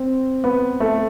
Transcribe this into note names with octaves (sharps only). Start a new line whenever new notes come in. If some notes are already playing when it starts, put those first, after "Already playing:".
Already playing: C4
B3
A3